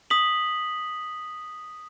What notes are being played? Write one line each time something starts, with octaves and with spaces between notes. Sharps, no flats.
D#6 B6 F#7